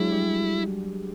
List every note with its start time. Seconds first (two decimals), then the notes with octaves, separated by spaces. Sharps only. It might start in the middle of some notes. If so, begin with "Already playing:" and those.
Already playing: F#3 G#3 D4 E4 F#4 G#4
0.12 G3 G4